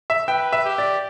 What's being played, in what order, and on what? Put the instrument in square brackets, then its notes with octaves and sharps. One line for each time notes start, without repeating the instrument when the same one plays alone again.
[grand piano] E5
[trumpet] B4 [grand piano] G5
[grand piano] E5
[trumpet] G4
[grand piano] D5